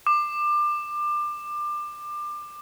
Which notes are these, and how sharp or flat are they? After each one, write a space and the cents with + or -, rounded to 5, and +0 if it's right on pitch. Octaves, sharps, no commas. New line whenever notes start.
D6 +25